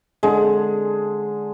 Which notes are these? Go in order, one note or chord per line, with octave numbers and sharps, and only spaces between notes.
D3 G#3